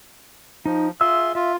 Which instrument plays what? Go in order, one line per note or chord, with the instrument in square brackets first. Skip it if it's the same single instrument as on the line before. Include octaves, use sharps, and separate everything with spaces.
[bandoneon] F3 [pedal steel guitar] D#4
[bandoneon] F4 C6 [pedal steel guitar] G#4 E5 E6
[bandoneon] F4 [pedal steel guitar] E5